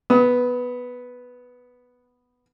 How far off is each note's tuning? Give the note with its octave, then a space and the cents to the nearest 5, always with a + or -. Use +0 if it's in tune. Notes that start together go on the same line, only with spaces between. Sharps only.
B3 +0 D#6 +30